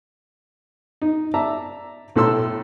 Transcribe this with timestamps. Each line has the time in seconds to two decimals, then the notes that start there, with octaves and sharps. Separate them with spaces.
1.02 D#4
1.34 D5 E5 A5 A#5
2.16 B1 A2 A4 C6 E6